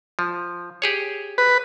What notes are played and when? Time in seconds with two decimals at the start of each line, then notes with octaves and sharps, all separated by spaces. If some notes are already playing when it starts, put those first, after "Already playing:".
0.19 F3
0.82 G4 G#4 C#5
1.38 B4